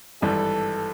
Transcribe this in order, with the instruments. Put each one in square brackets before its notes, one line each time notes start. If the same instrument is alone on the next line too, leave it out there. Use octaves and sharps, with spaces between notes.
[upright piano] G#1 G2 E3 G3 [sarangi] A4